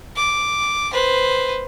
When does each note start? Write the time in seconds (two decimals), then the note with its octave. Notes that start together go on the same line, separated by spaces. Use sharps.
0.16 D6
0.92 B4 C5